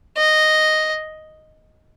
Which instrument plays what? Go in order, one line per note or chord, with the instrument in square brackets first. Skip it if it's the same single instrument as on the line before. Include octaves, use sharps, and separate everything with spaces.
[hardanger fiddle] D#5